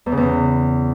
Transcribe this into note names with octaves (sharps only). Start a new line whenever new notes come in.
E2
C#3
E2
C#3